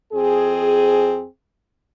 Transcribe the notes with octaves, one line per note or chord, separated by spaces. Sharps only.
F2 C4 G#4